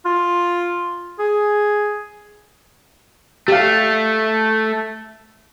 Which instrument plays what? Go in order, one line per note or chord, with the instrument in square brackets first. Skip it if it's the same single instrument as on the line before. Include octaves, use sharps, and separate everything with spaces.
[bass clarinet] F4
G#4
[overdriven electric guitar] A3 [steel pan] G4 F5